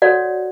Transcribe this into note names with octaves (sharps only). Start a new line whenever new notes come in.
F#4 A4 C#5 D5 F#5